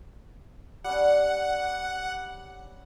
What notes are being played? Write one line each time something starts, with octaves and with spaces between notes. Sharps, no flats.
G3 C#4 F#5